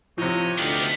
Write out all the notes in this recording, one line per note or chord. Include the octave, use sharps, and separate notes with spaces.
A2 C3 F3 C#5 D#5
D2 B3 D4 D#4 F4 G4